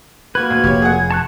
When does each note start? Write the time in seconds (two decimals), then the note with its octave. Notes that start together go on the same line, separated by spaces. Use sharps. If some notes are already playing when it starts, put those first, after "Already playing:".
0.35 A#3 F#4 B4 G#6
0.50 D2
0.64 F1 G4 C#5
0.82 G#4 F#5
1.11 A5 C#6 F#6